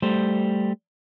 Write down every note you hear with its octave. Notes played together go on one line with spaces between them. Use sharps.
G3 A3 C5